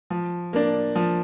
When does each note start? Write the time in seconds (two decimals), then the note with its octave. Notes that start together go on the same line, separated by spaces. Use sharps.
0.10 F3
0.53 A#3 D4
0.96 F3